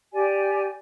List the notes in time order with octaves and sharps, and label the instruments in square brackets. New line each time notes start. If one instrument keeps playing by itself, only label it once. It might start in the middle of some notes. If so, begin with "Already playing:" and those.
[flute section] G4 D5 G#5